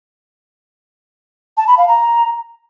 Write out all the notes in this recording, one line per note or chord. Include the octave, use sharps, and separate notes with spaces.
A5
B5
F5
A#5